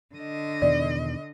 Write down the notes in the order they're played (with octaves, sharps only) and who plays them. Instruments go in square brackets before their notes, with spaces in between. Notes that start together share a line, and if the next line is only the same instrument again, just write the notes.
[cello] D3 D#5
[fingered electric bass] E2 B2 D#3 [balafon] D5